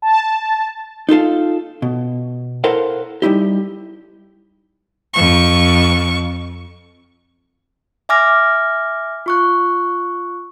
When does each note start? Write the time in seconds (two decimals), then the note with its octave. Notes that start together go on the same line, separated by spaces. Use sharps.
0.02 A5
1.09 D#4 F4 A4 F5
1.82 B2
2.64 E4 A4 A#4 C5 F5 F#5
3.22 G3 D#4 E4 G4
5.14 F2 C#6
8.09 E5 G#5 D6 F6 A#6
9.26 F4 C#6 F#6